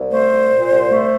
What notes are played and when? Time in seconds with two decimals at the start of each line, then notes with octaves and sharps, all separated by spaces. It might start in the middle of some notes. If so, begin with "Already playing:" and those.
Already playing: C2
0.12 A3 C5
0.31 C2
0.52 A#2
0.71 C2
0.91 A3